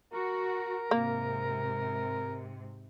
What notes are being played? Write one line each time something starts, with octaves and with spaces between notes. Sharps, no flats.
F#4 A#4
G#2 C3 A#3